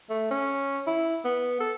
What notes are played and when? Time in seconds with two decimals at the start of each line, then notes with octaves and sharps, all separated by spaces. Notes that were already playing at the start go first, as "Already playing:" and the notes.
0.10 A3
0.31 C#4
0.87 E4
1.25 B3
1.60 A4